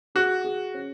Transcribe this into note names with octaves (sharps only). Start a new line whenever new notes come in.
F#4 G#4
G#4
C#4